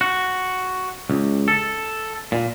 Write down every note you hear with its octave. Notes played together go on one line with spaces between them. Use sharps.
F#4
C#2
A4
A#2